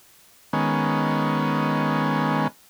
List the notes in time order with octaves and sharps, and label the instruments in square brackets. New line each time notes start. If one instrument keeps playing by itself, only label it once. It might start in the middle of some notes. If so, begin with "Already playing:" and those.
[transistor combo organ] D#3 G#3 B3 C#4